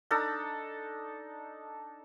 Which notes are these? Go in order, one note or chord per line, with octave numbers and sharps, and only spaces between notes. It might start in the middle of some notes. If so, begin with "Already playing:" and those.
D4 D#4 A4